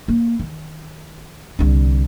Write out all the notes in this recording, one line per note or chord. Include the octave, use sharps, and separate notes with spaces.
A#3
D#3
C2 D3